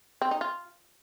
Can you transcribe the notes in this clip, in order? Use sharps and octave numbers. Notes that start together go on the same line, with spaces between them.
C4
D#4
F4